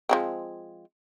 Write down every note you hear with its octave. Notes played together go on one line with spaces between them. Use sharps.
F3 G#3 C4